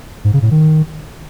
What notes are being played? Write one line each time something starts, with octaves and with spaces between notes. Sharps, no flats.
G#2
C#3
A2
D#3